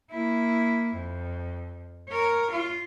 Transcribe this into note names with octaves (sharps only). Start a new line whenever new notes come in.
A#3 E4
F2
A#4 C#5
F4